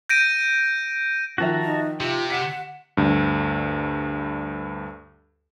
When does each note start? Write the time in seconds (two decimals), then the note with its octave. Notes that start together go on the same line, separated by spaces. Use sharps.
0.09 G6 A#6 D7 D#7
1.38 D#3 F3 F#4 E5 A5 A#5
1.62 D#4
2.00 C3 F4 G4
2.30 F#5 B6 C#7 E7
2.97 D2 G2